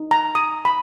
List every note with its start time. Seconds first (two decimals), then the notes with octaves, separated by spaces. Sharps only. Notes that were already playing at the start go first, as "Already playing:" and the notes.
Already playing: D#4
0.11 A#5
0.35 D#6
0.65 B5